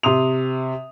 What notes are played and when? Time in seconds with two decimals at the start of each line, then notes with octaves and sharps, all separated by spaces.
0.03 C3 C6 D#6 F7